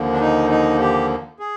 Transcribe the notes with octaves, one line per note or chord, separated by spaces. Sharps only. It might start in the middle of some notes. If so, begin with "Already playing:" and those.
Already playing: D#2 D3 F3 A#3
D4
D#4
D#4
G4
G#4